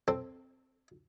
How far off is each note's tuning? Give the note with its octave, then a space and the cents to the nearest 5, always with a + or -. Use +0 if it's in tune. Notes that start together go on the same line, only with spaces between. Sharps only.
C4 +0 A4 +0